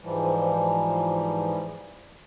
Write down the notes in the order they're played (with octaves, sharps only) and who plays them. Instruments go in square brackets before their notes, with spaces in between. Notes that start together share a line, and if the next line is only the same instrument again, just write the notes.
[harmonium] G#2 E3 F3 G3